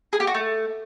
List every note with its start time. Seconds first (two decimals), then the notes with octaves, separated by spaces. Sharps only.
0.13 G#4
0.20 G4
0.27 F#4
0.34 A3